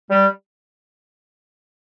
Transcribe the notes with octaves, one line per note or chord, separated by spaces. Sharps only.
G3